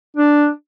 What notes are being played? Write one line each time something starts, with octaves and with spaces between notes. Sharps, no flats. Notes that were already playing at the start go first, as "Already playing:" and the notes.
D4